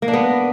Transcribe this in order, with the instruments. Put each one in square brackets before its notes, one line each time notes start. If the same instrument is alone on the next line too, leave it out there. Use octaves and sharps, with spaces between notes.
[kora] A#3
D4
B3